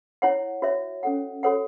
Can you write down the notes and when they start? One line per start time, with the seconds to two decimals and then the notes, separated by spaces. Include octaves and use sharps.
0.22 E4 C#5 F#5
0.62 F#4 C#5 E5
1.03 C#4 A4 F#5
1.43 F#4 A4 C#5 F#5